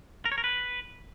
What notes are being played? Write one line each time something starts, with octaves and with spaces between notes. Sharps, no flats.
A#4
C#5
A#4
B4